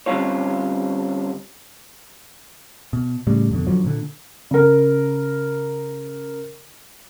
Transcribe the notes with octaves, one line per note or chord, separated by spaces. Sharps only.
D3 G3 C4 C#4 F4 C#5
B2
A2 C#3 G3
F2 B2 D3
F#2 D3 F3 F#3
A#2 D3
C#3 A#4